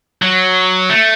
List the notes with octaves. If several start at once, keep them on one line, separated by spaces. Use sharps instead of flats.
F#3
A3